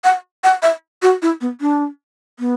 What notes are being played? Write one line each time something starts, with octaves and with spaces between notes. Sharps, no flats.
F#5
F#5
E5
F#4
E4
B3
D4
B3